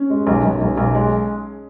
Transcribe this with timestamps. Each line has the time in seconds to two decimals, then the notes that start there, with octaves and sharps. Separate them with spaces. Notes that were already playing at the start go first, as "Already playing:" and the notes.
Already playing: C#4
0.10 G#3
0.27 B1
0.44 B1
0.61 B1
0.77 B1
0.95 G#3